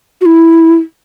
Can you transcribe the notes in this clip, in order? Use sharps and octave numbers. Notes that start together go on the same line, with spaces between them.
F#4
E4